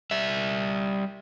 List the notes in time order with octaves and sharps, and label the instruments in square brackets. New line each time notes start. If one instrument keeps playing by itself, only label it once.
[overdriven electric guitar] G3 E5